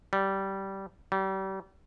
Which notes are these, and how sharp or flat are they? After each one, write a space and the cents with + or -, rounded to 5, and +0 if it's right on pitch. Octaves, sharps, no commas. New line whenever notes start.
G3 -15
G3 -35